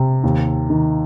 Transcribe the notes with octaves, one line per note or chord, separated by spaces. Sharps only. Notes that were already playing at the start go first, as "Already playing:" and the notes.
Already playing: C3
D#2
D#3